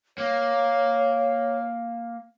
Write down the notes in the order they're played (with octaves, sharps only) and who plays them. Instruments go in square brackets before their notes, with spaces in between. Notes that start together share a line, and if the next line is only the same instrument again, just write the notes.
[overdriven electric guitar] A#3 [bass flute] C#5